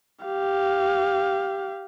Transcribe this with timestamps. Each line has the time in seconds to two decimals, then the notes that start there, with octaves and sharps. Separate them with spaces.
0.25 G4 F5